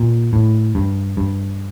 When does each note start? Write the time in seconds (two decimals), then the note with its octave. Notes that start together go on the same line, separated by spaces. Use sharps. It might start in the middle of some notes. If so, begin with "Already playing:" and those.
Already playing: A#2
0.33 A2
0.75 G2
1.17 G2